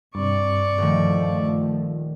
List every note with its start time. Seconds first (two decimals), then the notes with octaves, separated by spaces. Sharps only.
0.15 G2 C3 D5 C#6
0.78 D#1 D#3 F3 A3